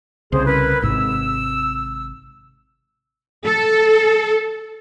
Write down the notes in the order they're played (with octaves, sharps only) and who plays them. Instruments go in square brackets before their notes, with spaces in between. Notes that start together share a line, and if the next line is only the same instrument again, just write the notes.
[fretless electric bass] C2 C#3 [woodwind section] G#4 C5
[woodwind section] E4 A#4 B4
[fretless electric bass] G#1 G#2 C3 [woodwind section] E6
[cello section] A4